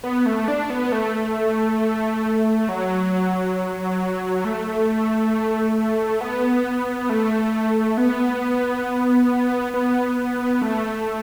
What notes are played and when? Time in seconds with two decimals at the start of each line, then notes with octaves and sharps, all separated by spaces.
0.04 B3
0.26 A3
0.48 D4
0.70 B3
0.92 A3
2.69 F#3
4.45 A3
6.21 B3
7.09 A3
7.97 B3
9.74 B3
10.61 A3